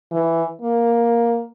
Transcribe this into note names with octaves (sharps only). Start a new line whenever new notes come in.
E3
A#3